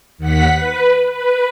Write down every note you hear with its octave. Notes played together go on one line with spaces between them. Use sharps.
D#2 F#5 B6
B4
B4